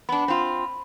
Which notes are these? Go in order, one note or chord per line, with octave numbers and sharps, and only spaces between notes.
B3 D4 B5
C4 F4